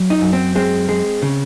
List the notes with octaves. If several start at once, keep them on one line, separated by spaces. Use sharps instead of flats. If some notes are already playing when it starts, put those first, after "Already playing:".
Already playing: F#3
D#4
F#2
C4
G#3 C4
G#3
C#3